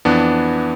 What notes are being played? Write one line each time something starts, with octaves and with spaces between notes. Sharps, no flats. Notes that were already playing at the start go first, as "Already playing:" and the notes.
F2 E3 B3 D4